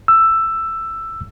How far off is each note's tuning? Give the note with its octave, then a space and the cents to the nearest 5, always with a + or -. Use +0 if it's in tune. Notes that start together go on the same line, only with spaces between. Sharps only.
E6 +10